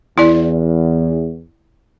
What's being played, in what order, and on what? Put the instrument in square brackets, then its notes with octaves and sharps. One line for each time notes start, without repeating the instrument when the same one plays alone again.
[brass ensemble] E2 [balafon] E4 D5